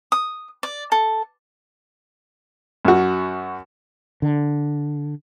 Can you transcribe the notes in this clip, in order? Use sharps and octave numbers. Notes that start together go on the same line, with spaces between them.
D#6
D5
A4
F#2 F#4
D3